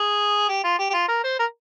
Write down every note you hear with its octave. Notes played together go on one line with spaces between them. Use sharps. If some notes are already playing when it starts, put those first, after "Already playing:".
Already playing: G#4
G4
F4
G4
G4
F4
A#4
C5
A#4